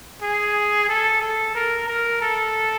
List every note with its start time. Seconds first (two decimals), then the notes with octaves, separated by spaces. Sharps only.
0.22 G#4
0.89 A4
1.22 A4
1.55 A#4
1.88 A#4
2.21 A4